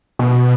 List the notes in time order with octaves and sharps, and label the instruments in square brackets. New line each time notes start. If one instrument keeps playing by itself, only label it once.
[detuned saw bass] B2